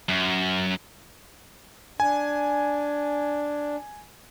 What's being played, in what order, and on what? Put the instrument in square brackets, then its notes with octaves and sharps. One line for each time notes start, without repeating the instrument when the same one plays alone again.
[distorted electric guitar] F#2
[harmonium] D4 [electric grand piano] G#5